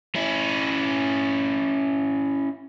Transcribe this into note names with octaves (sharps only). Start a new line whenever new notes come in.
C#4 E4